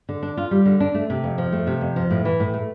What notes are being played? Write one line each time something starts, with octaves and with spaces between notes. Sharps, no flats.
D3
D4
F4
G3
D3
D4
A3
C3
F2
F3
A3
C3
F2
F3
A2
E3
A2
A3